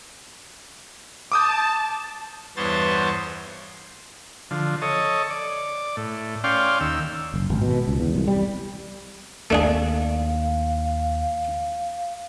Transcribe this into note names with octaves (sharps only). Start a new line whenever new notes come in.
A5 D6 D#6 G6
E2 G2 B3 C5 C#5 A6
D3 F3
A4 C#5 D#5
D5
A2
C#4 D5 F5 G5 C6
D#2 E6
F#1
G#1
B2
C#2
E2
C2
G3
D#2 A3 D4 G#4 F5